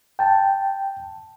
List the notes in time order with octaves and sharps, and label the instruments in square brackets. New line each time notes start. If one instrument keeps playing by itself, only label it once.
[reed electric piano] G5 A5